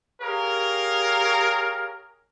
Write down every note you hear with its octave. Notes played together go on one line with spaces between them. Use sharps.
G4 G#4 A#4 C#5 F5